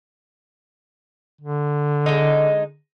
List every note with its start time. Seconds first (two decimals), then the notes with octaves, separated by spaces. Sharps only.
1.41 D3
2.06 G#3 D#4